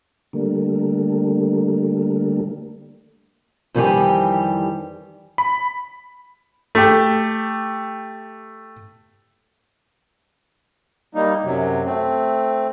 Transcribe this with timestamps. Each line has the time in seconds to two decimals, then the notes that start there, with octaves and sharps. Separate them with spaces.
0.33 D3 G3 A3 A#3
3.74 F2 D#3 E3 G3 G4 G#5
5.38 B5
6.75 A3 G4
11.15 G3 A#3 D#4
11.44 F#2 C3 F#3
11.85 A3 C4